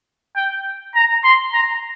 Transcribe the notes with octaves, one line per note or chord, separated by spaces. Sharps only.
G5
A#5
C6
A#5